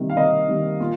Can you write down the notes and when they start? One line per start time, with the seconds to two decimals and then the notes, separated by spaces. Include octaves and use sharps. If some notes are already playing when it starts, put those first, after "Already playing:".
Already playing: C3 D#3 G3 A#3
0.10 F5
0.16 C3 A#4 D#5
0.48 D#3 G3 A#3
0.80 A#2 F4